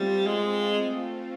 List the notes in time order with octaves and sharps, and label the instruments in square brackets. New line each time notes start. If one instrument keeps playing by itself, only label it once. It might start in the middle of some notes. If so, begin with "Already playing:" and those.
Already playing: [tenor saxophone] G3 [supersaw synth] A3 C4 F4
[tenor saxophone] G#3